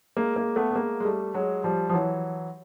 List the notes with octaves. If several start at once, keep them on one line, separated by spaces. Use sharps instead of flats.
G#3 A#3
G#3 A#3
A3 B3
B3
G#3 A#3
G#3
G3 A3
F#3 G#3
F3 G3
F3
E3 F#3